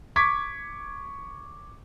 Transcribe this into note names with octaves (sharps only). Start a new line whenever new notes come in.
C#6 D6 G#6 B6